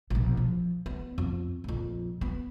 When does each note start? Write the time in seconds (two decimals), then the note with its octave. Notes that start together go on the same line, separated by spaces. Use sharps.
0.10 E1 A#1
0.37 F3
0.86 B3
1.18 F2
1.64 A#1 F2
2.21 B3